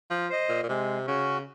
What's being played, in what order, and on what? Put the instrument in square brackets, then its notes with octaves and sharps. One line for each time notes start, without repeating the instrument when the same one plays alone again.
[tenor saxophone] F3
[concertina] C5 D#5
[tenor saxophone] A#2
A#2
[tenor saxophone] C3 [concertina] G#3
[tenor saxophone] C#3 [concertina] C#4 F#4